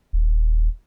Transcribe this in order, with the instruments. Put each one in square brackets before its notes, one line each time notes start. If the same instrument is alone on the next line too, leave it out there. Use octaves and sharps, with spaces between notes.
[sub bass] D#1